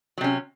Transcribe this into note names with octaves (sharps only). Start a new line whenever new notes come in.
C3 F#3 C#4